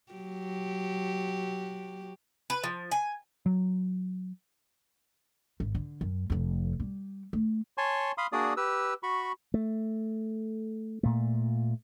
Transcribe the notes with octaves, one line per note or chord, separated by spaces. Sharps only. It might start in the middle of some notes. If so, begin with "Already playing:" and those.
F#3 G4
B4
F3
G#5
F#3
G#1
D3
F#2
F1 F2
G3
A3
C#5 G#5 A5 C6 C#6
F5 B5 C6 D#6
A#3 D4 F#4 G#4 D5 D#6
G4 B4 E6
F#4 B5 C#6
A3
A#2 A3